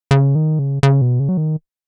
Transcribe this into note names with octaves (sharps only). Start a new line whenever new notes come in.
C#3
D#3
C#3
C#3
B2
C#3
F#3
D#3